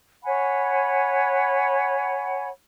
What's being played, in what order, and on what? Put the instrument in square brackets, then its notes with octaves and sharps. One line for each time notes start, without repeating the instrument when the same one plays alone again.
[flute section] C#5 F#5 G#5 B5